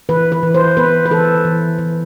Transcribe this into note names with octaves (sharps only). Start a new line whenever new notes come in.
E3 B4
B4
E3
C5
B3 B4
B4
E3 A4
E3
E3